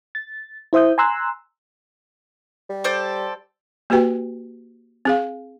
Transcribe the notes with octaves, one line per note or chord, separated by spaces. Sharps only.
A6
E4 C5 E5 D#6 G6
G#5 A#5 C6 E6 F#6
G3
A4 C5 D5
A#3 F#4 G4 B4 G5
C4 G#4 F5